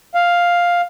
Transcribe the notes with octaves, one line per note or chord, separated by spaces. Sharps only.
F5